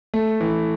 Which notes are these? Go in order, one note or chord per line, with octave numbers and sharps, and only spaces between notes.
A3
E3